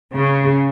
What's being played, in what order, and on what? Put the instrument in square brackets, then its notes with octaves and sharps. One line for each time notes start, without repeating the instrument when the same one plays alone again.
[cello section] C#3